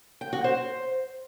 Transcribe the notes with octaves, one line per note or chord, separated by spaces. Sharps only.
G5
F#4
C5